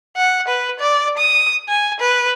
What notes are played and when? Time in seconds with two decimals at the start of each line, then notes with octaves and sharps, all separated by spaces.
0.17 F#5
0.48 B4
0.80 D5
1.17 D#6
1.68 G#5
2.00 B4